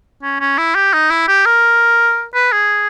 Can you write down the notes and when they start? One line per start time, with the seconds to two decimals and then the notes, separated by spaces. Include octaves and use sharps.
0.23 C#4
0.40 C#4
0.58 E4
0.75 G4
0.93 D#4
1.10 E4
1.28 G4
1.46 A#4
2.34 B4
2.52 G#4